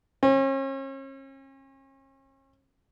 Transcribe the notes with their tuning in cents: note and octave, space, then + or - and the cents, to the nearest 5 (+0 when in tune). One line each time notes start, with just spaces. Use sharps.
C#4 -40